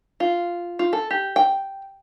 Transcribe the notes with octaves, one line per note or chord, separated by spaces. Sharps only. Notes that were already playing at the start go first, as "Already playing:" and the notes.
F4
F4
A4
G4
G5